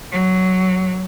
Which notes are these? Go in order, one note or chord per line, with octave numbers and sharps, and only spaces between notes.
F#3